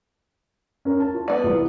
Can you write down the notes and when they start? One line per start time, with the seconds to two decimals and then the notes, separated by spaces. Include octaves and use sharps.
0.85 C#4 A#4
1.00 A5
1.14 F4
1.28 B3 D5
1.43 C2 E3 F3